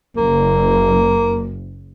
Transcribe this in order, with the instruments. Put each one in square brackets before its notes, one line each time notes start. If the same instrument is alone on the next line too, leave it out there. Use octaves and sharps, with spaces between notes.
[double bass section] F#1 [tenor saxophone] A#3